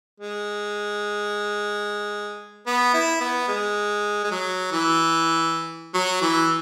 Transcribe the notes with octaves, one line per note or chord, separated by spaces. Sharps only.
G#3
B3
E4
B3
G#3
G#3
F#3
E3
F#3
E3